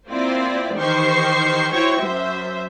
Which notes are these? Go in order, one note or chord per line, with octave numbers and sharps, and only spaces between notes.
A#3 C4 E4 F4 C5 D5
D#3 E3 G4 C5 C#6 C7
E4 F#4 C5 C#5 G5 C#6
F#2 C5 E5